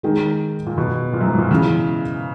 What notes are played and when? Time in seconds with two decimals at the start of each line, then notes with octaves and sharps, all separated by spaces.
0.03 D#3 G#3 D#4 G#4
0.66 A#2
0.78 B2
1.13 A#2
1.21 F#2
1.26 G#2
1.38 A#2
1.51 C#3 E3 B3 E4 G#4